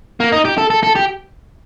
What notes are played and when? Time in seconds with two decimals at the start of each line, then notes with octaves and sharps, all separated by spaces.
0.20 A#3
0.32 D#4
0.45 G4
0.58 A4
0.70 A4
0.83 A4
0.95 G4